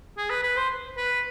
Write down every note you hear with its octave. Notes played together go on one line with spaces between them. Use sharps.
G#4
B4
B4
C5
B4